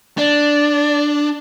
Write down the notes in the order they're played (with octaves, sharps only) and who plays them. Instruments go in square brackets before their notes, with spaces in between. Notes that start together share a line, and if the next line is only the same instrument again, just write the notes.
[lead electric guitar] D4 [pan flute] D5